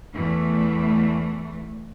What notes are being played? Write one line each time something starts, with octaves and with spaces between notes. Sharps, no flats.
E2 E3 A3